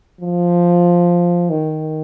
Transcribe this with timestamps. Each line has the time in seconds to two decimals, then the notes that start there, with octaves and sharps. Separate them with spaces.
0.21 F3
1.50 D#3